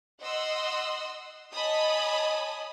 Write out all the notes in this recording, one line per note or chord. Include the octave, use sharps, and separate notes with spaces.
D#5 F#5 C6 E6
C#5 D#5 G#5 A5 B5 D#6